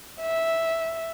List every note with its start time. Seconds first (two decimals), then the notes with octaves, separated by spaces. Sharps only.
0.21 E5